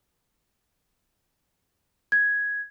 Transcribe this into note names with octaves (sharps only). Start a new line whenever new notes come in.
G#6